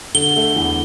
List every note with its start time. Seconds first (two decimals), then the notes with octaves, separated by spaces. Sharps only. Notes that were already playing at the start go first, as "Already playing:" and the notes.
0.14 D3 G7
0.36 A3
0.56 E2